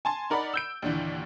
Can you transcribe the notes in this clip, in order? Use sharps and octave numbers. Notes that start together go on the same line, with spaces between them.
G#5 A5 C6
D#4 A#4 D5 F#5 B5
E6 G6 D7
D#2 A#2 D3 E3